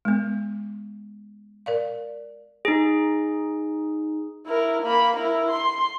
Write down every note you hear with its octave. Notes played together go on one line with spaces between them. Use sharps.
G#3 B3
A#4 D5 F5
D#4 G#4
E4 A#4
A#3 B5
E4 A#4
C6